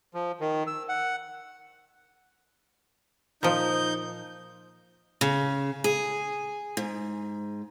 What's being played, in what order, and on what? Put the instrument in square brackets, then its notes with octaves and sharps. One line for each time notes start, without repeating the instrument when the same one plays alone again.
[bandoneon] F3
D#3
E6
F#5
[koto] A#2 F3 [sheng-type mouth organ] D#4 G6
[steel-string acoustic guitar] C#3
G#4
G#2